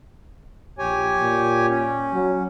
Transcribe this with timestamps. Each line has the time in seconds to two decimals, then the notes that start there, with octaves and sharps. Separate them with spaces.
0.78 A#1 G4 C#5 G#5
1.22 A#2
1.68 C#4
2.13 F#3